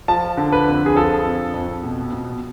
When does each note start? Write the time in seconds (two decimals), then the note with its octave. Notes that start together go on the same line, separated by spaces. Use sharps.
0.08 F3 A5
0.37 D3
0.52 B4
0.67 F2
0.86 G#4
0.96 F3 A4
1.26 F2
1.54 F2
1.83 B2
2.13 B2